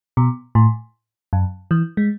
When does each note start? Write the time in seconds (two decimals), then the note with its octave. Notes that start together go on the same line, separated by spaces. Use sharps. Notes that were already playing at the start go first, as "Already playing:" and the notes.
0.17 B2
0.55 A2
1.33 F#2
1.71 E3
1.97 G#3